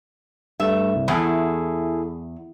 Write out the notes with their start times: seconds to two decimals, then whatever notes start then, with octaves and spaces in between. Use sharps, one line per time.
0.60 G2 A3 E5
0.95 C2
1.08 E2 E4 G#4 A4